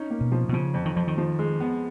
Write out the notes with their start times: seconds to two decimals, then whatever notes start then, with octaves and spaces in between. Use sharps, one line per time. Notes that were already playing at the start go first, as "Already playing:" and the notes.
Already playing: C#4 D#4
0.10 A#3
0.21 B2
0.32 F3
0.49 B2
0.53 C#3 F3
0.74 F2
0.85 D#3
0.96 F2 F3
1.08 D#3
1.18 F3
1.39 G#3
1.60 B3